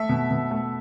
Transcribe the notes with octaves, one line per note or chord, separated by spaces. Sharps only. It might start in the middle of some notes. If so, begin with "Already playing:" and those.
Already playing: A3 E5
B2
B2
A3